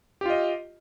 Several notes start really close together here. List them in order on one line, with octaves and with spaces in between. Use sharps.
G4 F4 D#5